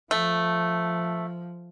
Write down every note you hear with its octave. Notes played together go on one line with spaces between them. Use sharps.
F3 A3